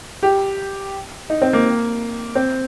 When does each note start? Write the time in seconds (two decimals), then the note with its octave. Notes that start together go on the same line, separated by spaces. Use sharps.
0.23 G4
1.30 D#4
1.42 C4
1.53 A#3
2.35 C4